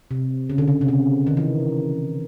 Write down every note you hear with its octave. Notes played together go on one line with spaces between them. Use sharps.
C3
C#3
D3
C#3
C3
C#3
D#3
E3